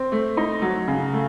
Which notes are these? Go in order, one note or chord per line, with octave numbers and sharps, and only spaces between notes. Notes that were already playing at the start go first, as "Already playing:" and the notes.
Already playing: C4
A3
D#4
F#3
C#3
A3